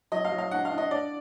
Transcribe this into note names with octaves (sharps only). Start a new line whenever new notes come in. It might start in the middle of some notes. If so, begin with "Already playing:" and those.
F#3 D#5
F5
F#3
F5
D4 F#5
F5
D4
D#5
D4 D5